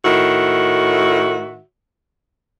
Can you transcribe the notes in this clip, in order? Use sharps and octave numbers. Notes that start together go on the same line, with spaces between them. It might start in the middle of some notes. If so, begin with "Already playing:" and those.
A2 D#3 F#4 E5